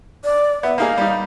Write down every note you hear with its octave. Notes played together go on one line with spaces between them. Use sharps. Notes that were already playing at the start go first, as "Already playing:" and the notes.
D5
B3 E5
A#3 D#4 G#4 F5
G3 D#4